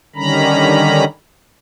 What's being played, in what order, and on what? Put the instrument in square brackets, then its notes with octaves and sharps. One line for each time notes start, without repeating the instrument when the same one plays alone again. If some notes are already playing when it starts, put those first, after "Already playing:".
[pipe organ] D3 D#3 G3 C#4 A#5 B5